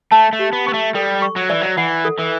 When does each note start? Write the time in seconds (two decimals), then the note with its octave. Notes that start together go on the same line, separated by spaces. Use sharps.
0.11 A3 A5
0.33 A3
0.39 G4
0.53 B3
0.67 B3 C#6
0.74 A3
0.95 G3 A4
1.22 C#6
1.36 F#3
1.49 E3 D5
1.61 F#3
1.77 E3 F#5
2.05 A4
2.19 E3